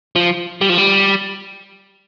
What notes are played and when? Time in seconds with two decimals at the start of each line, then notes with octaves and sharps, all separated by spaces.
0.16 F3
0.61 G3
0.69 F3
0.78 G3